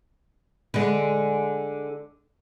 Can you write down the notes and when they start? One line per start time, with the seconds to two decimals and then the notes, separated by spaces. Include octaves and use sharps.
0.74 D3 G#3